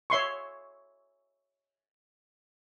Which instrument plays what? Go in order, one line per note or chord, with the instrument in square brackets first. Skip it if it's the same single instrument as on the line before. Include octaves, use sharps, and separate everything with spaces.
[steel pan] C#5 E5 C6 C#6